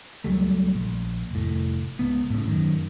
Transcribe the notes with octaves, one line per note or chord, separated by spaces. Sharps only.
C#2 F#3 G3 A3
A#1
F1 A2
C#2 B3
A2 C#3
F#2 D#3